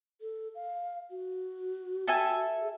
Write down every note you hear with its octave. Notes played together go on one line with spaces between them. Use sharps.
A4
F5
F#4
A4 E5 G#5
G#4